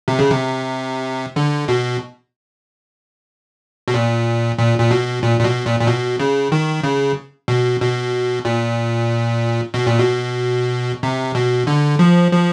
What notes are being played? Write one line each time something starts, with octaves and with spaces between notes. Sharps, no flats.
C3
C#3
C3
D3
B2
B2
A#2
A#2
A#2
B2
A#2
A#2
B2
A#2
A#2
B2
C#3
D#3
C#3
B2
B2
A#2
B2
A#2
B2
C3
B2
D3
F3
F3